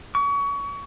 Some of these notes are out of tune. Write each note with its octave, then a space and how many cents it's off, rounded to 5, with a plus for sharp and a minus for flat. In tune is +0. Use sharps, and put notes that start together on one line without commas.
C#6 +30